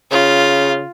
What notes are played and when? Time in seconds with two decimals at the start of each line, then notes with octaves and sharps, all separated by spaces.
0.12 C#3 F4